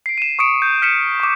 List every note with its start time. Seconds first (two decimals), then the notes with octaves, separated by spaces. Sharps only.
0.06 C7 D7
0.18 D#7 E7
0.39 C#6 D#6 C#7 D7 E7
0.62 G6
0.82 F6 B6 C#7 D#7 E7
1.20 C#6 D6